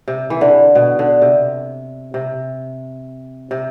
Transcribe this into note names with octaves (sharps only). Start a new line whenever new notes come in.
C3
E3
D3
B2
D3
C3
C3
C3